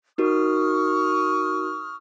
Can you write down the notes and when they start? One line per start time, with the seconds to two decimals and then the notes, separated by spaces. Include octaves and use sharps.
0.18 D#4 F#4 A#4 C#6 D#6 F6